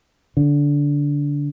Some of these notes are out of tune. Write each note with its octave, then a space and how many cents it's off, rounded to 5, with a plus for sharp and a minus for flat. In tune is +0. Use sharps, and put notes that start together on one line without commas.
D3 -20